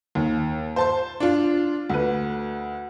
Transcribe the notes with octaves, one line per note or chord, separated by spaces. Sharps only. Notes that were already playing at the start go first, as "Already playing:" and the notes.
D#2
C5 A5 C6
D4 F4
D2 B4